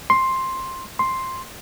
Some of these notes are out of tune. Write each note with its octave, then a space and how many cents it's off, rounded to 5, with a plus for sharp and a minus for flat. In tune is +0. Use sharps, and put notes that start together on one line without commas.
C6 +10
C6 +5